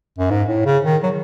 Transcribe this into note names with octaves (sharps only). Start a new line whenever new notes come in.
F#2
G#2
A2
C#3
D#3
F#3